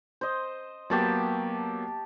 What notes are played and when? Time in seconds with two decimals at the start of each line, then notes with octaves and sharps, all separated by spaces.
0.21 C5 D#5
0.90 F#3 A#3 B3 G4 A5 C#6